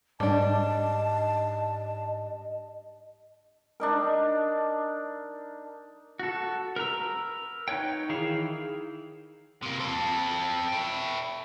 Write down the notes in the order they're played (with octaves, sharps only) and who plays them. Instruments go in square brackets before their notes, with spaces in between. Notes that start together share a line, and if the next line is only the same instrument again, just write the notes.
[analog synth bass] G#2 [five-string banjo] G3 D4 [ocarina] D#5 [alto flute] A5
[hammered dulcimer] D4 D#4 A#4
[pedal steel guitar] F#4 A4
A#4 B4 A#5 E6
D#4 B4 C#5 G5
D#3 E3 E4 G#4 F5
[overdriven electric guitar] C3 A#3
C4 A4
E4 G5